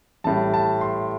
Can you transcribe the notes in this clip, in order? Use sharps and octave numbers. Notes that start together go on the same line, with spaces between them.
A1 A2 G3 A5
A5
C6